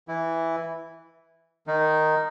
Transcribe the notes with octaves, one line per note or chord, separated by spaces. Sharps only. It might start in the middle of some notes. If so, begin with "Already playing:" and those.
E3 E4
D#3 D#4